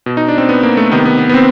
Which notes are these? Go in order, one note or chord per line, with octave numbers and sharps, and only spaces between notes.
B2
D#4
D4
C4
B3
A#3
A3
C3 D#3 B3
B3
B3
B3
C4